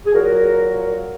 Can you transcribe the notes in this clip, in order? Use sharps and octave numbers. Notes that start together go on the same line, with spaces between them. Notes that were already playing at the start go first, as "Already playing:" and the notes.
G#4
A#2 F#3 F#4 A#4